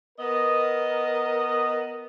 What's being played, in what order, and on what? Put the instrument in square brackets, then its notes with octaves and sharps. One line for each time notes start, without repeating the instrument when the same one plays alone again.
[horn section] B3 A#4 D#5